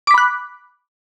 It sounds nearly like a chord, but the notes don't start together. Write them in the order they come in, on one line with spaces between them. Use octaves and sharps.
D6 B6 B5 F#6